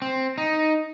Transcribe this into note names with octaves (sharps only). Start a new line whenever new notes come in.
C4
D#4